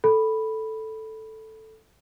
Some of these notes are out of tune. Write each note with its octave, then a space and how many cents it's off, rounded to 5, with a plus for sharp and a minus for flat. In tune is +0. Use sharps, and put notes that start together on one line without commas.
A4 +0 B5 +0